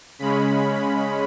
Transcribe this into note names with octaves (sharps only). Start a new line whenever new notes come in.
C#3 G#3 C#4 B5